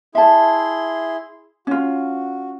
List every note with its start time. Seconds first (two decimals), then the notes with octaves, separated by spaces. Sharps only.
0.15 E4 G#4 E5 A5 C6
1.67 C#4 F4 F#4